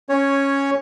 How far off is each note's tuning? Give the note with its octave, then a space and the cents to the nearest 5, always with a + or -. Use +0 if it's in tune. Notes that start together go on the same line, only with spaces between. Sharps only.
C#4 -5 C#5 +0